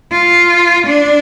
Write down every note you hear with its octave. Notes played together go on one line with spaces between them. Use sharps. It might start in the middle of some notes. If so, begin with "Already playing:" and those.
F4
D4